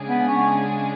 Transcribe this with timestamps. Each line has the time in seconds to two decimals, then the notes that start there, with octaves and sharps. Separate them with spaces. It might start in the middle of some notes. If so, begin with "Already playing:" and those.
Already playing: C#3 G#3 D4 G#4
0.08 B3
0.28 C#4